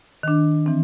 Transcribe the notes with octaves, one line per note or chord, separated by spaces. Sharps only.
D#3 D4
E3 C4